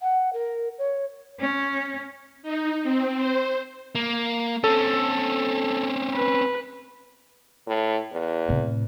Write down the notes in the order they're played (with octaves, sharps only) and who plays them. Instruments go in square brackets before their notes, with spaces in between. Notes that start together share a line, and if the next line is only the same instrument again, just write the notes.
[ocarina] F#5
A#4
C#5
[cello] C#4
[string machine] D#4
C4
C5
[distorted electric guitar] A#3
[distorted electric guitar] C4 C#4 [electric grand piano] A4
[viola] B4
[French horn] A2
E2
[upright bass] A2 C3